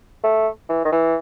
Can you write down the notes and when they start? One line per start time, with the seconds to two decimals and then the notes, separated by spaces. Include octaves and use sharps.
0.24 A3
0.69 E3
0.85 D#3
0.92 E3